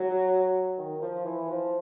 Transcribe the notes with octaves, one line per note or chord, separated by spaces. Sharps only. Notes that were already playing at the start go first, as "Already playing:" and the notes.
Already playing: F#3
D#3
F3
E3
F3